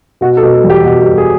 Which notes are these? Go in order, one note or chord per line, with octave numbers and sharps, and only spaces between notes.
B2 F#4
A4
B2
A4
E2
G4
B2 F#4
G4
B2
G#4